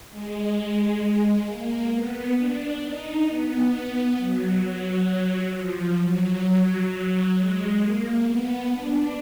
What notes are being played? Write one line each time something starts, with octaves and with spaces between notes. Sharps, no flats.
G#3
A#3
B3
D4
D#4
B3
B3
F#3
F#3
F3
F#3
F#3
G#3
A#3
B3
D4